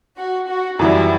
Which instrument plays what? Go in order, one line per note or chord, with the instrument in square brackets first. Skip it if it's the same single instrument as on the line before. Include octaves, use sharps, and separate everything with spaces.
[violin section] F#4
F#4
[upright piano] F#2 E3 G3 [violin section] E4